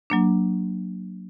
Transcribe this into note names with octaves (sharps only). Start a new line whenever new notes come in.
F#3 A#3 D4